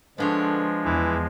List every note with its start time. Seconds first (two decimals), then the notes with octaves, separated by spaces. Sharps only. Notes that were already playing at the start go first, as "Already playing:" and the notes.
0.18 D3 F3 G#3 B3 D4 C#5
0.85 E2 E3